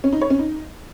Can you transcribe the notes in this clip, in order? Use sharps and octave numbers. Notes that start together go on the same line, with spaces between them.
C#4
D#4
C#5
C#4
D#4